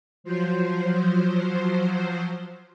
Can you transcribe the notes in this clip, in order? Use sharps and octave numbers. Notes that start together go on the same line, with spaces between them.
F3 F#3 C5